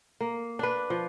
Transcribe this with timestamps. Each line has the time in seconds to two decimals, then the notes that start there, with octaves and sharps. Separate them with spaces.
0.21 A#3
0.59 D4 B4
0.90 F3